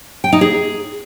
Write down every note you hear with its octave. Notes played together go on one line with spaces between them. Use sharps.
G5
D#4
G#4